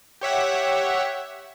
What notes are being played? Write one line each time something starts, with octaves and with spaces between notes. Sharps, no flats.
G4 C#5 E5 F#5